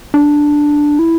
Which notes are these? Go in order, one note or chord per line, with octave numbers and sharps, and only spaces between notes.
D4
E4